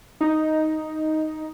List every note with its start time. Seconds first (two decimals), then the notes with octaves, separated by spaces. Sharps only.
0.21 D#4